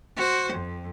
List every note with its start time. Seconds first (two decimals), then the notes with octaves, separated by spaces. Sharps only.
0.16 F#4 C5
0.53 F2